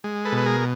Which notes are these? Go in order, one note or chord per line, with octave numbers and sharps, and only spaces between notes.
G#3
A4 B4
B2
B4
G#4 A#4